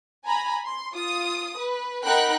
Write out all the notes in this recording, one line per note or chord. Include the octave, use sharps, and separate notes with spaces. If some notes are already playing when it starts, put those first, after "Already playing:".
G#5 A#5 B5
C6
F4 D#6
B4
D#4 A#4 F#5 G5 B5 F#6